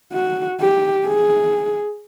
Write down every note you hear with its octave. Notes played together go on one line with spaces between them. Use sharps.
F#4
G4
G#4